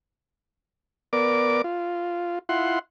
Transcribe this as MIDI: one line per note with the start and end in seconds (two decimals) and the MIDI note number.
1.13 1.62 59
1.13 1.62 70
1.13 1.62 74
1.13 1.62 86
1.64 2.39 65
2.49 2.79 64
2.49 2.79 65
2.49 2.79 78
2.49 2.79 84